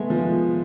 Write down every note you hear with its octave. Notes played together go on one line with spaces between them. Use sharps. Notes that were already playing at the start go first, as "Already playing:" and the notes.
Already playing: G#3 A3 B3
F3